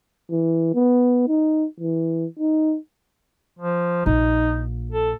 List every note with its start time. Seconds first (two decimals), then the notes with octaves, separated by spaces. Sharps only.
0.31 E3
0.74 B3
1.28 D#4
1.80 E3
2.39 D#4
3.59 F3
4.06 A#1 A#2 D#4
4.92 A4